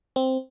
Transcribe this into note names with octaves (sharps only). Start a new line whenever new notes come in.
C4